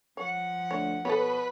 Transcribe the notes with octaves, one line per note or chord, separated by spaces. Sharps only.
F3 C#5 F#5
D2 C#5
B2 A4 B4 C#5